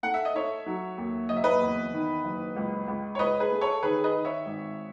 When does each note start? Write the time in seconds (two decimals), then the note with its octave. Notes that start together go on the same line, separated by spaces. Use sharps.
0.03 A3 F#5
0.14 E5
0.25 D#5
0.35 A3 C#5 E5
0.66 F#3
0.98 D#2
1.29 F#1 D#5
1.37 E5
1.44 B4 D#5
1.61 E2
1.93 D#3
2.24 F#1
2.56 C#2
2.88 C#2
3.15 C#5
3.19 C#2 B4 D#5
3.40 G#4 B4
3.51 A3
3.61 A4 C#5
3.83 D#3 G#4 B4
4.04 B4 D#5
4.14 D#3
4.25 C#5 E5
4.46 G#1